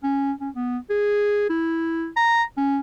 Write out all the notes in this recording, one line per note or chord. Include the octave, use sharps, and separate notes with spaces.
C#4
C#4
B3
G#4
E4
A#5
C#4